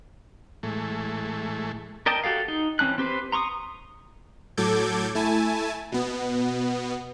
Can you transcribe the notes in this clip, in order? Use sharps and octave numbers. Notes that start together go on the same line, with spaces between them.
A2 E3 G#3 A3
A#4 D5 D#5 G5 A5
F#4 G4 A4 F5
D#4
E3 C4 C#4 A5 F#6
C4 G4 B4 C5
A#5 C6 C#6 D#6
A2 F#3 A4 D6 G6 G#6
A3 E4 G#5 A5
B2 B3